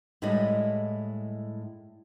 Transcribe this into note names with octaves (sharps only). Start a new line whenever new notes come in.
A2 G3 G#3 E4 C#5 D#5